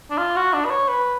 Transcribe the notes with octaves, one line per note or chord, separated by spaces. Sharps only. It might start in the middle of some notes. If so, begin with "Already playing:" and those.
D4
F4
F#4
D4
B4
C#5
B4